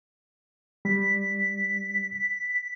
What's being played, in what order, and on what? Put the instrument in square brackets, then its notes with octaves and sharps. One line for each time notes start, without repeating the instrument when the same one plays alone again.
[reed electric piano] G3 [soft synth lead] B6